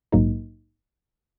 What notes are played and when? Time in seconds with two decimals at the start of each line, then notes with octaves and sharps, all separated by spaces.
0.12 A#1 G#2 F#3 A#3 D#4